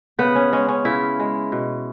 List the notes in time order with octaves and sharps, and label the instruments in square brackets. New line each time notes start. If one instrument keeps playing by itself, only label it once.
[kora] C#3 B3
C#4
G#3 C#4
C#4
C#3 E4
G#3
B2